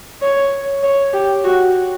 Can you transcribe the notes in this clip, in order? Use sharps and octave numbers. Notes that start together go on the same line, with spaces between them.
C#5
C#5
G4
F#4